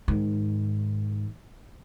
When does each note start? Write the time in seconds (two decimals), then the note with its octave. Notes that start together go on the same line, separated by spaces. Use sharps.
0.08 G#2 D#3